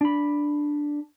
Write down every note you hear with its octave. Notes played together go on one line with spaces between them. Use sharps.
D4 B5